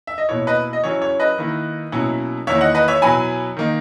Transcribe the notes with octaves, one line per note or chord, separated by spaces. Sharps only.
E5
D#5
B2 A#3 E4 C#5
B4 D#5
D#5
C#3 F#3 C#4 E4 C#5
C#5
B4 D#5
D#3 A#3 E4
B2 F#3 A#3 C#4 E4
E2 D#3 A#3 E4 C#5 E5
D#5 F#5
B4 D#5
C#5 E5
B2 F#3 B3 E4 G#5 B5
D#3 A#3 D#4